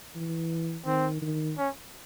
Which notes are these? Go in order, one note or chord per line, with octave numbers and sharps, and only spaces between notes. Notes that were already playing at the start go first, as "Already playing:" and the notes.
E3
D#3 C4
D#3
C#4